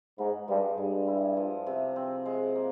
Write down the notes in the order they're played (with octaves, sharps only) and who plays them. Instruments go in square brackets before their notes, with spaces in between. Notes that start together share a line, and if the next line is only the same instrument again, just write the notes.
[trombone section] G#2 [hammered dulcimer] B3
[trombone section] G2 [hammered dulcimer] G#3
[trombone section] G2 [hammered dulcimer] G#3
[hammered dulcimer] E4
F3
C3
C4
G#3
A#3